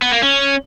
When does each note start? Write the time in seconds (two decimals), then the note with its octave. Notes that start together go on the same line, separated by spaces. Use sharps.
0.02 B3
0.12 A#3
0.22 C#4